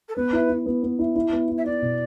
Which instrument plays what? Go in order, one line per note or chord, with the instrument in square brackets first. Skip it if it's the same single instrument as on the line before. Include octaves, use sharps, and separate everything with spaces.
[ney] A4
[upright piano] B3 [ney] B4
[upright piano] E4
E4
B3
B3
E4
E4
B3
E4
[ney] E5
[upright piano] E4 [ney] D5
[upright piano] B2